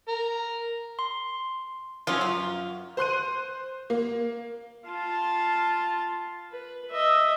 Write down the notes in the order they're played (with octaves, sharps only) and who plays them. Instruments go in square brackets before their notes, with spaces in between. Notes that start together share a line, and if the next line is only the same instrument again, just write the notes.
[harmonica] A#4
[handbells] C6
[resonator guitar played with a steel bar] F3 F#3 C#4 [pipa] F4
[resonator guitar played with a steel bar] F#2
[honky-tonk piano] C5 C6 F#6 D#7
A#3
[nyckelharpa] F4 A5
B4
D#5 E5